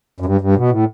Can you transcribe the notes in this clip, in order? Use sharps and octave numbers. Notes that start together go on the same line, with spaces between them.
F#2
G2
G2
B2
A2